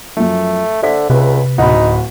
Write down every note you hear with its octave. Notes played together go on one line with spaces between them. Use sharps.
F#2 F3 A3
D3 C5 E5 B6
C#2 C3 B4
D1 D#4 F#4 F#5 B5